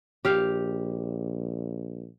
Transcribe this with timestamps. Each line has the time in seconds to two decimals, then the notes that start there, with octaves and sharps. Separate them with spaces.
0.25 A#1 G4 F5